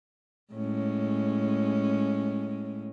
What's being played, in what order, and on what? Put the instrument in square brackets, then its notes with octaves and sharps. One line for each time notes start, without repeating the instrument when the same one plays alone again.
[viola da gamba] A2 G#3 C#4